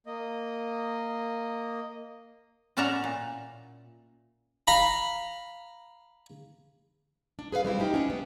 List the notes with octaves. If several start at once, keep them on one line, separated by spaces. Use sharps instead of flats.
A#3 D#5
A2 C#4 D5 E5 F#5 A#5
A#2
F5 A#5 B5
D4
G#4 B4 C5 F5
G3 C4 E4
D4 D#4 G4 A#4
C#4 D4 F#5
G#3 B3